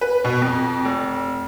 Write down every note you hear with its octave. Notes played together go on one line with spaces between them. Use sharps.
B4
B2
F2
F1